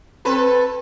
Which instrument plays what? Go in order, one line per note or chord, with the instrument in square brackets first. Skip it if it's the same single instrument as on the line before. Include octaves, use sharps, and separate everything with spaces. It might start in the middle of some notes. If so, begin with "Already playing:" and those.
[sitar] C4 A4 B4